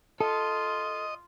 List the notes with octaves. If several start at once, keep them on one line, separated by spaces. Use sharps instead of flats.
F4 A4 D#5